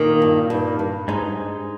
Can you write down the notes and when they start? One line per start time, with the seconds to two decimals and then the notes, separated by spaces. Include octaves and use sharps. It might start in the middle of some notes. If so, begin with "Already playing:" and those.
Already playing: A#2 D#3 A#3
0.22 G2
0.50 G2
0.79 G2
1.08 G#2 G#3 D#4